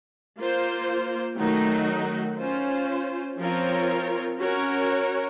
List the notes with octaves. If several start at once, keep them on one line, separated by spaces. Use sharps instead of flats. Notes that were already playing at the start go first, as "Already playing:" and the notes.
A#3 F4 C5
D#3 F#3 A3 D#4 F#4
C#4 F4 C5
F3 C4 F4 A#4 C#5
C#4 F#4 A#4 C#5